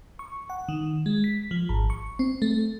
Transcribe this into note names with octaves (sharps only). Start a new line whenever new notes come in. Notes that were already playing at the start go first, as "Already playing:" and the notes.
C#6
F#5
D#3
G#3
B6
F3
G#1
C#6
C4
A3